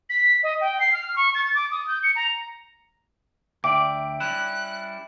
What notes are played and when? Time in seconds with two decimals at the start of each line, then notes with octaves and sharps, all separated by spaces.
0.10 B6
0.43 D#5
0.61 G5
0.80 C7
0.93 F6
1.16 C#6
1.35 A6
1.55 D6
1.71 D#6
1.88 G6
2.03 C#7
2.16 A#5
3.64 D2 D5 E5 G5 D6 D7
4.20 G3 C#4 E4 F#6